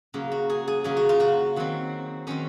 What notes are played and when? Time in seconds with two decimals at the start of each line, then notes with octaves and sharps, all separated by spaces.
0.14 C#3 F#3 A#3
0.32 F#4
0.50 G#4
0.68 G#4
0.84 C#3 F#3 A#3 G#4
0.97 F#4
1.09 F4
1.20 F#4
1.56 D#3 F#3 C4
2.27 D#3 F#3 C4 C#4